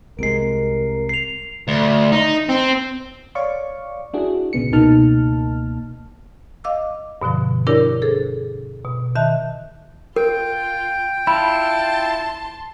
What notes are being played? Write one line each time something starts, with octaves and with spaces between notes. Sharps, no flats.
C2 C3 G#3 A#4 C7 D7
C7 F7
D2
D#4
C4
C#5 D5 F5 C#6 D6
D4 E4 F#4 G#4
A#1 C#3 B3 C#7
C#2 B2 A#3 D#4 A5 F6
D#5 F5 D6 E6
G2 B2 D3 F3
D4 E4 G4 A#4 C#5 D5
G#4 A4 C5
B2
D#3 E5 A5 F#6
F4 A#4 G5
E4 F4 A5 B5 C6